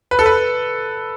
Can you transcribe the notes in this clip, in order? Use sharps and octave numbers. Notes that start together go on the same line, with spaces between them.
B4
A4
B4